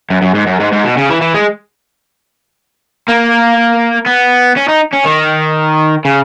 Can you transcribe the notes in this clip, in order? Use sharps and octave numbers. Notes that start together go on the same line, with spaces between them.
F#2
F#2
G#2
F#2
G#2
G#2
B2
C#3
E3
E3
G#3
A#3
B3
C#4
D#4
C#4
D#3
C#3